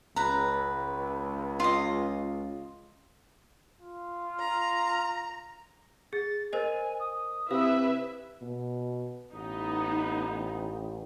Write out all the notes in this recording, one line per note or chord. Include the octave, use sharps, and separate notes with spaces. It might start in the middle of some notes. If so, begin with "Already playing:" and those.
C#2 B4 A#5
F4 D#5
F4
A#5
G#4 A6
A#4 C5 D#5 G#5
D#6
C3 E4 B4 E5 F5
B2
A1 B3 D#4